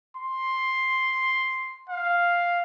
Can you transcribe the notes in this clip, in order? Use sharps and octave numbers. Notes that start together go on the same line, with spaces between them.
C6
F5